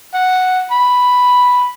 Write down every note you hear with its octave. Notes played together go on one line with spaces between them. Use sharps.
F#5
B5